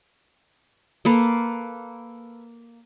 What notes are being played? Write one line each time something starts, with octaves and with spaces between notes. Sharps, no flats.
A#3 A4 B4